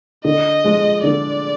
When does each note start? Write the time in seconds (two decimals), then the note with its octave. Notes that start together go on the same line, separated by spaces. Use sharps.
0.25 D3 D#5
0.64 F3 G#3
1.04 D3 D5